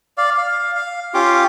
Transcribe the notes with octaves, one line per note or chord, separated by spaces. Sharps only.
D5 F5
F5
F5
C#4 F4 G4 D6